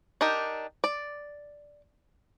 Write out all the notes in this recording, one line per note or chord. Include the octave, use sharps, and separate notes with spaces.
D4 D#4 G4 A#4
D5